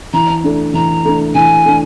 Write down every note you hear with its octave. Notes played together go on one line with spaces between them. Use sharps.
E3 A#5
A3 D4
E3 A#5
A3 D4
E3 G#5
A3 D4